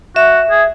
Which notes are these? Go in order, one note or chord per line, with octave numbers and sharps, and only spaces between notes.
F#4 E5
G#4